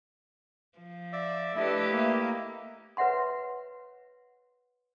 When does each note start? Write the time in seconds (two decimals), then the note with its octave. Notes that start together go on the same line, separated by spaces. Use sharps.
0.78 F3
1.13 D5 E5
1.56 A3 D4 E4 G4 B4 D#5 E5
1.90 A#3
2.97 B4 C#5 E5 F#5 C6